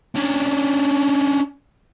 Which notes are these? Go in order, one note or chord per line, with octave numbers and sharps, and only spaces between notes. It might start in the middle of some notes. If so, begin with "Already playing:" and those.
C#4 D4